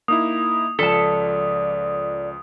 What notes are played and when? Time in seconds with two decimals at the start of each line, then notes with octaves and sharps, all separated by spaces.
0.08 A#3 D#4 E4 D#6
0.79 C#2 F3 A4 D5 A5 B6